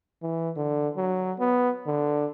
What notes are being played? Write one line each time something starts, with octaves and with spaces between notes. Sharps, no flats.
E3
D3
F#3
B3
D3